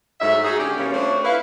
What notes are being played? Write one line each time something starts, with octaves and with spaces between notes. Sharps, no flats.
G#2 F#3 A3 E5
D#4 F#4 G#4
D3 C#4 D4 G4
B2 E3 G3 A#3 C#4
A3 C4 D4 F4 C5 C#5
E4 B4 F5